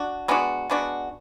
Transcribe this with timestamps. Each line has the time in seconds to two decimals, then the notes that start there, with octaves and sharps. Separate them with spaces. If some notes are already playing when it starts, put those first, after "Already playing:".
Already playing: D4 F#4
0.28 G#3 B3 D4 F#4
0.70 G#3 B3 D4 F#4